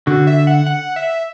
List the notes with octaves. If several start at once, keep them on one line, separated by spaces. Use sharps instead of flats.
D3 F#4
E5
F#5
F#5
E5